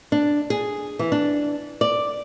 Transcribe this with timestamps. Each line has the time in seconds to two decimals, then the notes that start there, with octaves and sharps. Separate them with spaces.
0.12 D4
0.50 G#4
0.99 E3
1.12 D4
1.81 D5